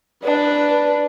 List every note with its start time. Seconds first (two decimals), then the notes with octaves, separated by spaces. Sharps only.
0.24 D4 B4